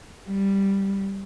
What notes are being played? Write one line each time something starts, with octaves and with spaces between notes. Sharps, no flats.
G3